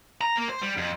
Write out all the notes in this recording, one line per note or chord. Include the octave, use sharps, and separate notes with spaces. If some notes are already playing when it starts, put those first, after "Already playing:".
A#5
A#3
C5
G3
F2